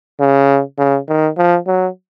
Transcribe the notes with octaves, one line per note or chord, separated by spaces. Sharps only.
C#3
C#3
D#3
F3
F#3